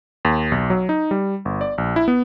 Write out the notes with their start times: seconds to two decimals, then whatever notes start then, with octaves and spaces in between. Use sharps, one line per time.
0.25 D#2
0.52 B1
0.70 F#3
0.89 D#4
1.11 G3
1.45 G1
1.61 D5
1.78 A#1
1.96 E4
2.08 B3